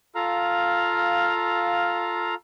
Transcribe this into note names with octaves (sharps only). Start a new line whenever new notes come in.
F4 A4 F5 A#5 F6